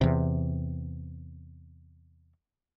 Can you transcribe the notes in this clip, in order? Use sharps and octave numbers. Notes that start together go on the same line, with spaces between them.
E2 C3